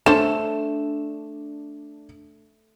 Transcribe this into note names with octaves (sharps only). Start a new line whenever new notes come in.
A3 C#4 D4 A4 C5 E7